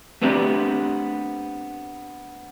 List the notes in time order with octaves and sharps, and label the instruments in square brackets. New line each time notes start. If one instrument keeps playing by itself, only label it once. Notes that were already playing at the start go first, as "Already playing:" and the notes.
[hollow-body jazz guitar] A3 B3 C4 D4 G4